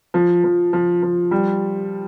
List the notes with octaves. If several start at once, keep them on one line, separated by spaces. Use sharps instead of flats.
F3
F3
F3
F3
G3